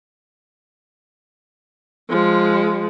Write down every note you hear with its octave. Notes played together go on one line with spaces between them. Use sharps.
F3 G#3